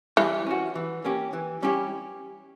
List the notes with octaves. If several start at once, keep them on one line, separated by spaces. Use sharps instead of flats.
E3 G3
C#4 F#4
E3
A#3 C#4 G4
E3
G3 C#4 E4 G4